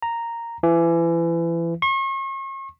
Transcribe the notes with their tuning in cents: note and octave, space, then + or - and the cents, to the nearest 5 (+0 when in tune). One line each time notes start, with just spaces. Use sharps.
A#5 -5
E3 +30
C#6 -40